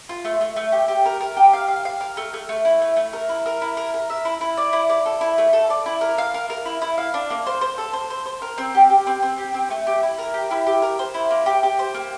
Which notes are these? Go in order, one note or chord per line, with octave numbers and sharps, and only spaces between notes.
F4
A3
A3
A3
G4
G4
A#4
A#4
G4
F5
F5
F5
A#4
A3
A3
A3
E4
A3
A3
A#4
E4
A#4
E4
A#4
A#4
E5
E4
E4
D5
E4
D5
A4
E4
A3
A4
D5
E4
A#4
F5
A#4
A#4
E4
E4
F5
D4
A#3
C5
C5
A4
C5
C5
C5
A#4
C4
G4
G4
C4
C4
G4
C4
A3
G4
E4
A#4
G4
E4
G4
A#4
C5
E4
A#3
G4
G4
C5
A#3